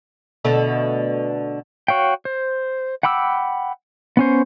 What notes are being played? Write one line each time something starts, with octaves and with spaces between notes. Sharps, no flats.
B2 D3 A3
F#4 C#5 F5 G5
C5
F#5 G5 B5 D6 E6
B3 C#4 C5